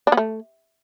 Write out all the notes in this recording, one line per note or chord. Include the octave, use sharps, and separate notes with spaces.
D4
B3
A3